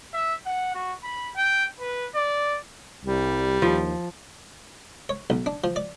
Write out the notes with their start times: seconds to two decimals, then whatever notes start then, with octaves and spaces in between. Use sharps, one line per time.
0.14 E5
0.46 F#5
0.75 F#4
1.04 B5
1.37 G5
1.80 B4
2.15 D5
3.05 C2 G3
3.62 D#2 F3
5.09 C#5
5.30 B1
5.46 D4
5.64 F3
5.76 D5